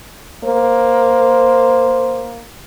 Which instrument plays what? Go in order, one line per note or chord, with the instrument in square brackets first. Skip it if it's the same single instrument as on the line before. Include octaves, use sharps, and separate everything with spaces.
[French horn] A#3 [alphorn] C5